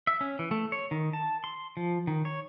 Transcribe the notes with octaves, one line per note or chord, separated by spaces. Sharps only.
E5
C#4
E3
A3
C#5
D#3
A5
C6
F3
D#3
C#5